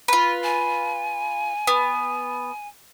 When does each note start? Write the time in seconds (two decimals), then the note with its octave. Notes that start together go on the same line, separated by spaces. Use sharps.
0.08 F4 B4
0.44 G#5
1.67 B3